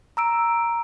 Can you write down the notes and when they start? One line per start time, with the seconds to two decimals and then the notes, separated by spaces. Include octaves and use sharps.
0.17 A#5 E6 D7